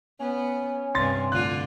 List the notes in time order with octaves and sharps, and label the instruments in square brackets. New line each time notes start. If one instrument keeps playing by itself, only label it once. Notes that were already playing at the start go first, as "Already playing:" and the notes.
[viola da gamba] B3 [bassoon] C#4
[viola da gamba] G2 C3 [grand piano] C6 A6
[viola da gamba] A2 D3 F4 [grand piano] F#6